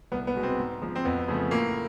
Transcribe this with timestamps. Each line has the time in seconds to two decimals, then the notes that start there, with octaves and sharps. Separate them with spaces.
0.12 C2 B3
0.27 B3
0.35 B2 G#3
0.43 C4
0.59 G#2
0.82 F3 G#3
0.95 C4
1.05 F2 B3
1.28 C#3 F3 A3
1.51 A2 A#3